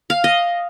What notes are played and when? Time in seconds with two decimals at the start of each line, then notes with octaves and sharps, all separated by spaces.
0.10 F5
0.24 D#5